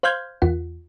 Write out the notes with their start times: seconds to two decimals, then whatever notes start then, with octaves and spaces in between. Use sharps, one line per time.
0.03 C5 F5 C6 F6 G6 G#6
0.42 E2 F4 F#5